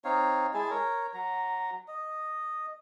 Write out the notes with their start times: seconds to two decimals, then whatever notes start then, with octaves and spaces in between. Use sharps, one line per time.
0.05 C4 D#4 C#5 F5
0.54 G#3 E4 G#4 A5
0.70 A#4 C#5
1.14 F#3 A#5
1.88 D#5